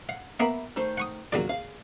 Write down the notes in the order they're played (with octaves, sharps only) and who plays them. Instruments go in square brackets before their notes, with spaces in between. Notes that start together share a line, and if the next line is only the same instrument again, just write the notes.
[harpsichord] F5 [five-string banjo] F#5
[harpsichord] A#3 B3 F5 [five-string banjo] E5 A#5 B5
[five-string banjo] D#3 A3 C5
[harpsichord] F#5 C#6 D#6
[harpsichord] D#2 C#3 D5 [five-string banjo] F#3 F4 F#4
[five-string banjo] G#4 F5